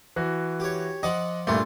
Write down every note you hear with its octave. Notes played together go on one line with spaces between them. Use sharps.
E3 F#4
G4 C#5
F3 D#5 F#5 D6
G2 A#2 A3 A#3 F4